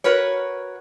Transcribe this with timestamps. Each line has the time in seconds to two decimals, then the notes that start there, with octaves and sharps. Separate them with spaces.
0.04 F#4 A#4 B4 C#5